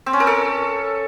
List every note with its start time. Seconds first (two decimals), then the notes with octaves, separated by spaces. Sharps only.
0.06 C4
0.13 C#4
0.20 A#4
0.27 A4